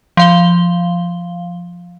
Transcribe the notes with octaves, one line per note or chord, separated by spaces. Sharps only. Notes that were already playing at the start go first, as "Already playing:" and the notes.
F3 F5 G7